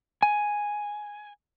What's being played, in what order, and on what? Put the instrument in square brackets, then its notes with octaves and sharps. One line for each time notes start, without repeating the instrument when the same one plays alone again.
[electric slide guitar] G#5